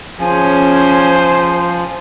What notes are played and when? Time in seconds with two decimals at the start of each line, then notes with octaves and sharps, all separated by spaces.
0.19 F3 C#4 G#4 C5 G#5